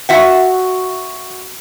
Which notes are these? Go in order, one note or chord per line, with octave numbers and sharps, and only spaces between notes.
F#4 E5 F#5